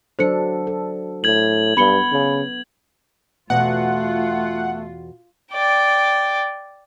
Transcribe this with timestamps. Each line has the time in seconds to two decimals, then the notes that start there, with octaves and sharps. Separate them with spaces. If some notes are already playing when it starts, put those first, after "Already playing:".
0.19 F#3 D4 A4 C5 C#7
0.67 A4
1.24 A2 G#6 F#7
1.77 G2 B3 B5 C#7 G7
2.12 C#3
3.50 E2 B2 A3 F4 F#4 F#5
5.52 D5 G5